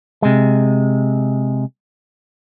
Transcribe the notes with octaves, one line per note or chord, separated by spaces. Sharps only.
C3 G#3